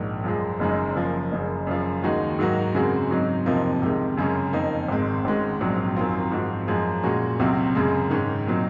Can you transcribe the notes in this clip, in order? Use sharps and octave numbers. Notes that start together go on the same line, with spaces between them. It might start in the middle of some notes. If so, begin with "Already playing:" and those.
Already playing: A#1 G#2 D#3
F#2 F3 G#3
F#1 F#2 C#3 G#3 D#4
F#2 C#3 F3 A#3
F#1 F#2 C#3
F#2 C#3 F3
D#2 D#3 G#3 D#4 F#4
G#2 F#3 A#3 D#4 F#4
F#2 C#3 G#3 C4 F#4
G#2 F#3 C4 D#4
F2 C3 F3 A#3 D#4
C#2 C3 D#3 G#3
F#2 C#3 G#3 C#4
F2 D#3 A#3 D#4
G#1 G#2 D#3 G#3 C4
G#1 G#2 D#3 G#3 C#4
A#1 G#2 F#3 C4
F#2 D#3 F#3 C4 F4
G#2 F3 C4 F#4
F#2 F3 G#3
A#2 G#3 C#4 F#4
C#2 C3 F#3 C4 F#4
F#2 C#3 G#3 C#4
G#2 D#3 G#3 C#4
A#2 F#3 C4 D#4